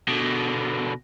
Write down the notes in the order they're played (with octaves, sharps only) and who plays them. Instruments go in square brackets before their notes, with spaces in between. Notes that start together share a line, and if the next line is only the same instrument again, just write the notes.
[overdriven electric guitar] B2 D3